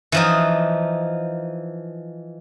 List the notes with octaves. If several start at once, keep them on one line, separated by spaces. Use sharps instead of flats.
E3 F3 D#4